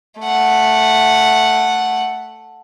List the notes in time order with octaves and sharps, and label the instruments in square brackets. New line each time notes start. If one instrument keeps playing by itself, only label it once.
[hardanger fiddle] A3 F#5